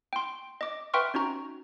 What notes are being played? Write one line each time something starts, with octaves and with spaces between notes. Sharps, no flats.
G5 C6
D#5 D6
B4 E5 G5 C6 C#6 F6
C#4 D#4 F#4 A#5